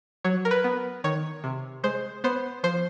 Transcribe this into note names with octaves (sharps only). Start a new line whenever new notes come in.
F#3 C#5
A#4
B4
B3
D#3 C#5
C3
G#3 C5
B3 C5
F3 C5